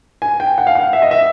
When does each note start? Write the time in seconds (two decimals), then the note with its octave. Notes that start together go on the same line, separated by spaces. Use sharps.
0.22 G#5
0.40 G5
0.58 F#5
0.67 F5
0.75 F#5
0.93 E5
1.02 D#5
1.11 E5